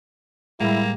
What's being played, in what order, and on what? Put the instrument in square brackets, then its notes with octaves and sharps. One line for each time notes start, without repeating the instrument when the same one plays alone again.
[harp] A2 G3 A#6 [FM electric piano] G#3 [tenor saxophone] A#3 [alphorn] E4